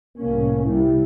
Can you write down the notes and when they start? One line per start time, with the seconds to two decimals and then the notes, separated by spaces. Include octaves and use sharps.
0.18 C2 A2 A#3 C#4
0.65 C3 G3 E4